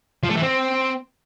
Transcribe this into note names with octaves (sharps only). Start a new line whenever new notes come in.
F3
A3
E3
C4